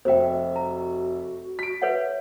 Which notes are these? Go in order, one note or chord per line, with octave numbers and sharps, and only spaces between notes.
F1 F#4 C5 E5 G5
A#5
F#4 B6 D7
B4 C#5 E5 F#5